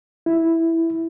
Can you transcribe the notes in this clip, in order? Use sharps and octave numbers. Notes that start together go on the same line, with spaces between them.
E4